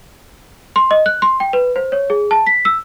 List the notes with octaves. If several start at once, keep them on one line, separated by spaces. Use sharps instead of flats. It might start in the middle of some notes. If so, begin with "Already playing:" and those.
C6
D#5
F#6
C6
G5
B4
C5
C#5
G#4
A5
B6
E6